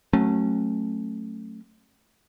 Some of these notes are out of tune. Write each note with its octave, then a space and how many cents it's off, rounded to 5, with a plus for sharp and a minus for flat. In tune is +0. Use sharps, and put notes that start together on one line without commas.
F#3 +0 A3 +0 C#4 -25